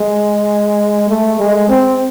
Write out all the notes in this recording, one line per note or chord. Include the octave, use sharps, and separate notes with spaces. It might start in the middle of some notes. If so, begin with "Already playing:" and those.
Already playing: G#3
A3
G#3
C4